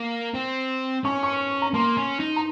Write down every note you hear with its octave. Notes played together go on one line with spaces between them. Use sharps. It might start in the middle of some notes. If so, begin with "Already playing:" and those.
Already playing: A#3
C4
C#4 C#6
C#6
A#5
A#3 C6
C#4
D#4
A#5